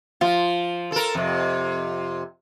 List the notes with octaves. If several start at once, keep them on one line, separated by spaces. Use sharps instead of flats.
F3 F4
A4 A#4
F2 C3